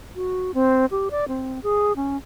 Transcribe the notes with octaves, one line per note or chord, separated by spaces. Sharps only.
F#4
C4
G4
D5
C4
G#4
C#4